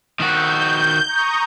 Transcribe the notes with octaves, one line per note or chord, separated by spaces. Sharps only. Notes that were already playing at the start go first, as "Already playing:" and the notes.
D#3 F#4 G6
A#5 C#6 D#6